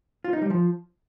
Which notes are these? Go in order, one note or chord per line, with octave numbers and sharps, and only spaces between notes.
F4
D#4
G3
F3